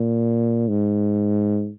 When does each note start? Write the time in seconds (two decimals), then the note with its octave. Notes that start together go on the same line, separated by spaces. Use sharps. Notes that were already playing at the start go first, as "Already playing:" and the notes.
Already playing: A#2
0.68 G#2